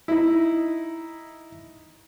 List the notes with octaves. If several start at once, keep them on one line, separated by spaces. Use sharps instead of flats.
D#4 E4